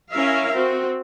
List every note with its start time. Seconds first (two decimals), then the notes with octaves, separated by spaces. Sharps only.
0.12 C#4 E4 A#4 E5 F5
0.54 C4 F#4